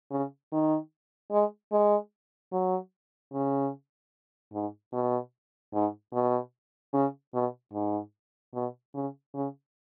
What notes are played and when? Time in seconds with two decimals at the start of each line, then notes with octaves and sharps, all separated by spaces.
0.11 C#3
0.52 D#3
1.31 G#3
1.72 G#3
2.52 F#3
3.32 C#3
4.53 G#2
4.93 B2
5.73 G#2
6.13 B2
6.93 C#3
7.34 B2
7.73 G#2
8.54 B2
8.94 C#3
9.34 C#3